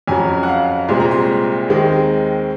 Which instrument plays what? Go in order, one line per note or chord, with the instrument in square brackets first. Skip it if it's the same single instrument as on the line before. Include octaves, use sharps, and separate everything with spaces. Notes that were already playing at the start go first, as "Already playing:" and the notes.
[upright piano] F2 C#3 F#3 G#5
F#5
F5
C2 A#2 G#3 C4 C6
A#5
C6
D#2 D#3 G#3 C4